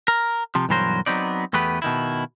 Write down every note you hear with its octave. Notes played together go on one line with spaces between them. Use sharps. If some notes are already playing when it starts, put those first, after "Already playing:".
A#4
C3 F3
B1 G2 E3 F#3 A#4 C5
F#3 B3 C4 D#4 D5
E2 A3 B3 G4 B4
B2 D#3 E4